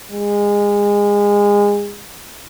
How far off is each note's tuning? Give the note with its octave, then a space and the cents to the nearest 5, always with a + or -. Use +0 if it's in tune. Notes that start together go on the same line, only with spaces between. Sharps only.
G#3 -25